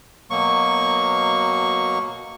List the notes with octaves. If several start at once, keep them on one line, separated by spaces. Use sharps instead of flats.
B2 F#3 A#3 C#6